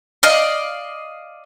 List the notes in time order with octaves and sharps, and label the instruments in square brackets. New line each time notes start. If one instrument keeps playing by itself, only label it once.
[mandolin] D5 D#5 F5